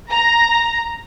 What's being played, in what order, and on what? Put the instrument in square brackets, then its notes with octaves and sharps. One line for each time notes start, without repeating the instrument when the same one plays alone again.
[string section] A#5